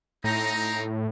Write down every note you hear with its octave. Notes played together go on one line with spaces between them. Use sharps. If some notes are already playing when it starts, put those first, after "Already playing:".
A2 C4 D#4 A#5